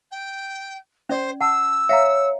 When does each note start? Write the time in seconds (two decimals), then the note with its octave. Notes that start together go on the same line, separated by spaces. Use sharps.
0.11 G5
1.09 C#4 C5 D5
1.41 F#5 A5 E6
1.89 C#5 E5 F5 A#5